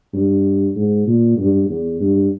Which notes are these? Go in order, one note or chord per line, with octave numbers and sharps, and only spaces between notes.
G2
G#2
A#2
G2
E2
G2